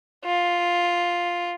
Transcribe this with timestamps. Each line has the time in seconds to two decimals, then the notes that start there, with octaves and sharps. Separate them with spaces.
0.24 F4